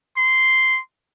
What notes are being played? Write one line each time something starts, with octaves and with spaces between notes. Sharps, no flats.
C6